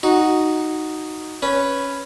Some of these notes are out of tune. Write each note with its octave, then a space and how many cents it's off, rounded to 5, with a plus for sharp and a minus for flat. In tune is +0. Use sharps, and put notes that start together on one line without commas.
D#4 +0 F#4 +0
C#4 +0 B4 +0